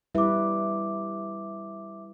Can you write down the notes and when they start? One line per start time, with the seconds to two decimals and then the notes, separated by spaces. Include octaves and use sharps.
0.15 G3 E4 B4 E5 D6